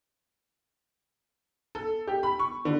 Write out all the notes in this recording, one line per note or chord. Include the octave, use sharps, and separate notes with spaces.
A4
G4
B5
C#6
D3